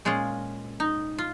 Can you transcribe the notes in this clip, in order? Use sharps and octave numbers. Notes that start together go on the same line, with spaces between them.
A#2 G#3 C#4 F4
D#4
F4